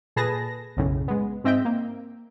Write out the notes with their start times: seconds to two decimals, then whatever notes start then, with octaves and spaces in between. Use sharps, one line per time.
0.16 A#2 G#4 A4 B4 A5 A#6
0.77 B1 F#2 A2 C#3
1.08 G#3 B3
1.44 G#2 C4 D#5 E5 G5
1.65 A#3